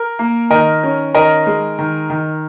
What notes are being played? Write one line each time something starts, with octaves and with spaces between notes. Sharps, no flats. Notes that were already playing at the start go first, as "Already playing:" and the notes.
Already playing: A#4
A#3
D#3 A#4 D#5
C#4
D#3 A#4 D#5
G#3
D#3
D#3